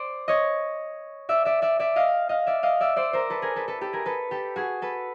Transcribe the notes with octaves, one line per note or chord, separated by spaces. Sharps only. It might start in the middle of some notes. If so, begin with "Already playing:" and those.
Already playing: C5 D5
C#5 D#5
D5 E5
D5 E5
D5 E5
D5 E5
D#5 F5
D#5 F5
D5 E5
D#5 F5
D5 E5
C5 D5
A#4 C5
A4 B4
G#4 A#4
A4 B4
A4 B4
G4 A4
G#4 A#4
A4 B4
G4 A4
F#4 G#4
A4 B4